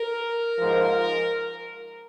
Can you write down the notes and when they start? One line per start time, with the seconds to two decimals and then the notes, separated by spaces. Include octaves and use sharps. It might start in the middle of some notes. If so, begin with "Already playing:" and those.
Already playing: A#4
0.59 G#2 F3